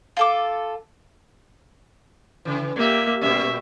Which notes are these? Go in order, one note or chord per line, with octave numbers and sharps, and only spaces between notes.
F4 A4 D6
C#3 E3
A#2 A#3 G4 E5
A#2 G3 C#4 E5